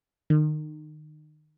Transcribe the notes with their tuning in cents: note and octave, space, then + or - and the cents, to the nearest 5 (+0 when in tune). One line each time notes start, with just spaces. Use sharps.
D#3 -30